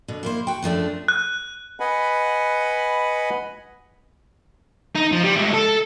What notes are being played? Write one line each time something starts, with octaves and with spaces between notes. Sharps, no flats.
B2 D3
A#3 E4 C5
F#4 G5
F#2 F3 A3 D4
F#6
B4 D#5 F#5 G#5 B5
D#4
F3
G3
G#3 A3
A4